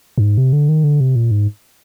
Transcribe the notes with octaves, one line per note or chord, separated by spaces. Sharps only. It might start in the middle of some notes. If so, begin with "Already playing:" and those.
G2
G#2
C3
D3
D#3
D3
C3
A#2
G#2